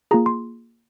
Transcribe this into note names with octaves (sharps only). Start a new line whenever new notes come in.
A#3 F4 G#4 A#5
C6